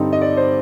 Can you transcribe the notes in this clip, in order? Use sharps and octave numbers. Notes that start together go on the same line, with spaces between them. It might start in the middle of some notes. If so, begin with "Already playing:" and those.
Already playing: G2 D3 G3 C4 D#4
D#5
D5
C5